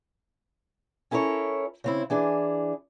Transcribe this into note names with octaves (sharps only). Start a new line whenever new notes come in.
C#4 E4 A4 A#4 C#5
C#3 C4 E4
E3 D4 G#4